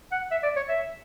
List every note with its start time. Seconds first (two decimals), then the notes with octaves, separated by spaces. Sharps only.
0.12 F#5
0.31 E5
0.43 D5
0.56 C#5
0.69 E5